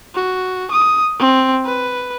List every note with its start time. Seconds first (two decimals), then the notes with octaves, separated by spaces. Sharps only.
0.15 F#4
0.72 D#6
1.19 C4
1.65 B4